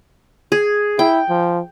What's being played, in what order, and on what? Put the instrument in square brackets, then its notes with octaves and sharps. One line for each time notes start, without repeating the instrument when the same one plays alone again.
[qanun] G#4
[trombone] E4 [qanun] G5
[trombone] F3